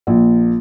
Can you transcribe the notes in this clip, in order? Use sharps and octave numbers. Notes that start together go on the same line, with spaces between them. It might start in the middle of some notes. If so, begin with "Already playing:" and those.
A#1